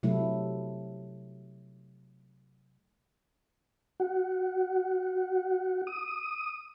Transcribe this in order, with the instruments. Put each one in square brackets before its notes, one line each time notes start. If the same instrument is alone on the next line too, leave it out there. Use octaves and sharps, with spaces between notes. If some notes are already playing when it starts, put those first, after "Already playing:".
[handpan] C3 F#3 A3 E4
[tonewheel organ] F#4
D#6